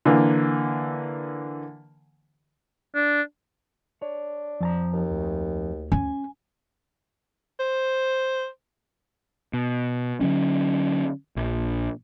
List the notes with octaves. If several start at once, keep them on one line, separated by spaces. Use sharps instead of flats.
D3 E3 A#3
D4
D4 C#5
F2 F3 A5 A#5
D#2
D2
C#4 G#5
C5
B2
D3 F#3 C#4
A#1